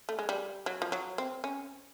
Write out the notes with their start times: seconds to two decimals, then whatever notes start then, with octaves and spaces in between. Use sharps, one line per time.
0.09 A3
0.19 G#3
0.29 G3
0.66 F#3
0.82 F3
0.92 F#3
1.18 C4
1.44 C#4